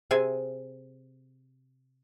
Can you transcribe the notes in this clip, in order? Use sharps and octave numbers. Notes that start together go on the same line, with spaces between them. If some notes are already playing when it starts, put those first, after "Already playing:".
C3 C4 G#4 E5 G#5